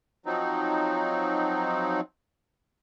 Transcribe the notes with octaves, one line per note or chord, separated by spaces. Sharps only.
F3 F#3 C4 D#4